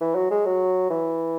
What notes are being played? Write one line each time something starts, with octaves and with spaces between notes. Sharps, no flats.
E3
F#3
G#3
F#3
E3